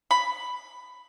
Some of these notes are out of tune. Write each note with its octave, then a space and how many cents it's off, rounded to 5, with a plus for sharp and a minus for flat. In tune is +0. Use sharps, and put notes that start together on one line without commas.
B5 +5